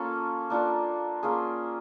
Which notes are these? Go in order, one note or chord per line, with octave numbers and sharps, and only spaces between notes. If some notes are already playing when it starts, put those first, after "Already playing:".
Already playing: A#3 C#4 F4 A4
A#3 D4 F4 A4
A#3 C#4 F4 G#4